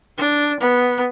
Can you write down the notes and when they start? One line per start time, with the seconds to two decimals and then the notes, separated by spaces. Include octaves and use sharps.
0.17 D4
0.60 B3